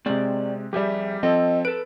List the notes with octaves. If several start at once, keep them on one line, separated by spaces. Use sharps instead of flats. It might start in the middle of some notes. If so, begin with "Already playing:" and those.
C3 G#3 C4 D5
F2 G3 G4 G#4 E5
F3 C4 A4 D#5
A4 B4 D7